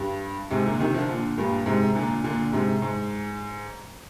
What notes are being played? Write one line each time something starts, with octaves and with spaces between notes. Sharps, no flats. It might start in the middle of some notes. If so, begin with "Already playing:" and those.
Already playing: G2
G#2 C3
A#2 D3
C3 D#3
D3 F3
A#2 D3
G2 A#2
G#2 C3
A#2 D3
A#2 D3
G#2 C3
G#2